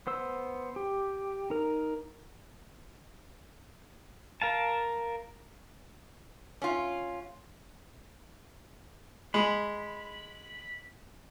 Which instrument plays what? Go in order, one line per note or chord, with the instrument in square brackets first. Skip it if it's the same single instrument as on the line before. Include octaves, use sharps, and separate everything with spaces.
[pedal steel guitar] B3 C5 E6
G4
D#4 A#4
A#4 F5 A5
[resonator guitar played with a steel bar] C#4 F4
[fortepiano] G#3 [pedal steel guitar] B5